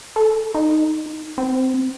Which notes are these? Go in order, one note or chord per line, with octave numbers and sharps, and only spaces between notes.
A4
D#4
C4